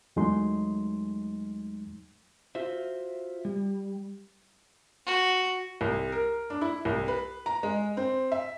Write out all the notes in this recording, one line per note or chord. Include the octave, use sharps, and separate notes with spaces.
E2 F#3 G#3 A3 D#4 C6
F4 F#4 C5 E5
G3
F#4
C2
A#4
D4
E4
C2
B4
A#5
G#3
C4
E5